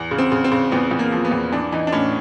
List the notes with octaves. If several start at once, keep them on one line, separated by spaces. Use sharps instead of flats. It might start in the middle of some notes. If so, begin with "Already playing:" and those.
Already playing: E2
C#3
C4
C#3
C4
C#3
E2 B3
E2
A#3
F3
B3
E2
E3 D4
E3 D#4
D4
A2 C#4